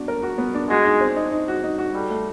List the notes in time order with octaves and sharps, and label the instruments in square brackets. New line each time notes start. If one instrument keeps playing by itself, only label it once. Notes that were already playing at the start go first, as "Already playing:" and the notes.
Already playing: [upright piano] B3 D4 F#4
A#4
F#4
B3
D4
[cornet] G#3 [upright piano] F#4
[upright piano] D#4
C4
D#4
D#4
F#4
D#4
F#4
[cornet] G3 [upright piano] A4
[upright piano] A3